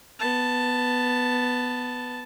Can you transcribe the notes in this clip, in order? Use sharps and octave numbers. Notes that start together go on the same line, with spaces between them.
B3 A5